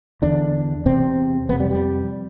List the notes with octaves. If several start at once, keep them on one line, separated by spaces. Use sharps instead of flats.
E2 D3 D4
E2 C3 C4
F2 C3 B3
G3
G3